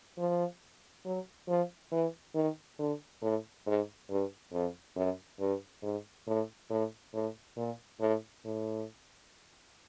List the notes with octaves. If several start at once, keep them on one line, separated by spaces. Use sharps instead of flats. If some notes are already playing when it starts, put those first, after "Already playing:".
F3
F#3
F3
E3
D#3
D3
A2
G#2
G2
F2
F#2
G2
G#2
A2
A2
A2
A#2
A2
A2